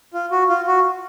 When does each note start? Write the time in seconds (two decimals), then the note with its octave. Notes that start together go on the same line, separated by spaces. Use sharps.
0.14 F4
0.31 F#4
0.49 F4
0.67 F#4